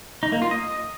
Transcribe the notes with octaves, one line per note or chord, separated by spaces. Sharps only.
D#4
A#3
F4
D#5